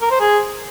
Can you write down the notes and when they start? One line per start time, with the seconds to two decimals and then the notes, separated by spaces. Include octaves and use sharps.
0.01 A#4
0.11 C5
0.20 G#4